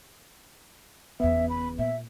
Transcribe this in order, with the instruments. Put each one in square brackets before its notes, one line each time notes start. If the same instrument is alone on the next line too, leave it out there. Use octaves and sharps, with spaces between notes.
[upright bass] F#1 E2 [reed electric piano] B3 [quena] E5
[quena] B5
[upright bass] A#2 [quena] E5